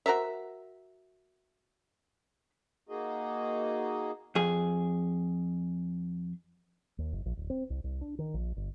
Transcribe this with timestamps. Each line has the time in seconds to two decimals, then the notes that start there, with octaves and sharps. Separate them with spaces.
0.06 F#4 A#4 C5 E5
2.89 A#3 D#4 F#4 G#4 D#5
4.35 F2 G#4
6.98 D#2
7.13 F#1
7.25 A#1
7.37 D1
7.50 C4
7.70 C2
7.84 C2
8.01 D4
8.19 D#3
8.34 A#1
8.56 G1